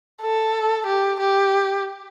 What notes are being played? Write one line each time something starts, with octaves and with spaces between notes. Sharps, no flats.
A4
G4
G4